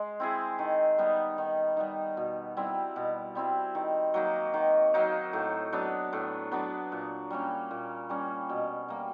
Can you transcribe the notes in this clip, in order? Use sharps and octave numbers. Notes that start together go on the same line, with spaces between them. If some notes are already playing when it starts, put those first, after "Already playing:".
Already playing: G#3
C4 E4 G#4
D#3
G3 B3 D#4
D#3
G3 B3 D#4
B2
G3 C4 E4
B2
G3 C4 E4
D#3
F#3 A#3 D#4
D#3
F#3 A#3 D#4
A2
F#3 B3 D4
A2
F#3 B3 D4
A#2
G3 A#3 C#4
A#2
G3 A#3 C#4
B2
G3 A#3